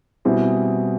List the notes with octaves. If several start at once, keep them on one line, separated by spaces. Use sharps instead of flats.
B2 G3 C4 E4 G#4